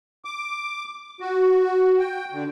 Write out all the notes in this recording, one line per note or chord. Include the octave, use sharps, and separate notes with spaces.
D6
F#4
G5
D3